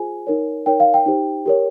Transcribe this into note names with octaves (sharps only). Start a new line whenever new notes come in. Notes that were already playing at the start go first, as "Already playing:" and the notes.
Already playing: F4 G#4 C5 G#5
D#4 A#4 C#5
D#4 A#4 C#5 G5
F5
G5
D#4 G4 C5
G4 A#4 C#5